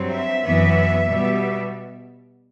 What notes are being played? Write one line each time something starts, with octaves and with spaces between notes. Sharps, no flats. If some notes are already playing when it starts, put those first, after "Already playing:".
Already playing: G2 F#3 C4
E5
F#2 E3 B3
B2 G3 B3